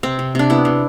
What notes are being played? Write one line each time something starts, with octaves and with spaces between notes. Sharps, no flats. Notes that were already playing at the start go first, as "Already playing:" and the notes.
C3 C4
C3
C3 D4
B3 E4
C3